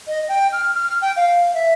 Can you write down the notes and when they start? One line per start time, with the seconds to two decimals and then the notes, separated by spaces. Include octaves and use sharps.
0.07 D#5
0.28 G5
0.52 F6
0.74 F6
1.01 G5
1.16 F5
1.54 E5